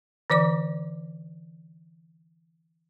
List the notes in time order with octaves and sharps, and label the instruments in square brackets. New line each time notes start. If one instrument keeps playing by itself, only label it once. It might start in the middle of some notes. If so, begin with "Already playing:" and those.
[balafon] D3 E3 D5 D6